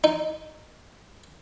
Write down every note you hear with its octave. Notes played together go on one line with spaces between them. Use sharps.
D#4